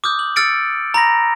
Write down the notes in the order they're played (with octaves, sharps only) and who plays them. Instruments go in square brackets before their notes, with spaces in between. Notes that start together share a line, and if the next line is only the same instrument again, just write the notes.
[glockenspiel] D6 D#6 F6 G6
F#7
E6 F6 A6 C#7 D7
A#5 B5 A#6